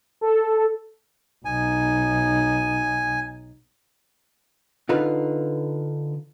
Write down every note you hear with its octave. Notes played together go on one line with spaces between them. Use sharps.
A4
B1 D#4 G#5
D3 D#4 F4 B4